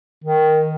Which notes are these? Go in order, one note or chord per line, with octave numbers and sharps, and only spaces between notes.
D#3